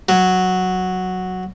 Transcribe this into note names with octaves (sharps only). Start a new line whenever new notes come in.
F#3